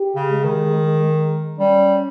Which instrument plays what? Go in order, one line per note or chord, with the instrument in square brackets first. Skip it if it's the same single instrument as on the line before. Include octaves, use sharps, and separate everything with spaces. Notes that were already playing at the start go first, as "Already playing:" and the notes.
Already playing: [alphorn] G4
[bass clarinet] C#3
[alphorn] G#3
[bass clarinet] D#3
[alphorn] G#3
G#3
[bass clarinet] G3 [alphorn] C#4